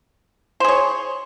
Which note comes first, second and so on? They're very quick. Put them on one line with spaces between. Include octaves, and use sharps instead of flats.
C5 G#4 C#5